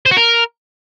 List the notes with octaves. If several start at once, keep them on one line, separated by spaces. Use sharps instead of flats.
C5
F#4
A#4